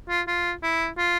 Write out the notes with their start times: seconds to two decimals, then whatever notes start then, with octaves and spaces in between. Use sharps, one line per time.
0.09 F4
0.28 F4
0.63 E4
0.98 F4